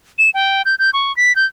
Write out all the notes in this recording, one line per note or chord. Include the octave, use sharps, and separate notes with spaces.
E7
G5
G6
G6
C#6
B6
G6